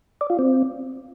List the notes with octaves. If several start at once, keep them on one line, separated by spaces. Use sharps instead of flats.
D5
F4
C4